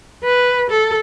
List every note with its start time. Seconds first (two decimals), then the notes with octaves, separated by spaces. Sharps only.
0.24 B4
0.70 A4